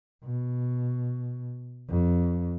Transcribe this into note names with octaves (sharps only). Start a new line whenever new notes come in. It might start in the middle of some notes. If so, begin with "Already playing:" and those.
B2
F2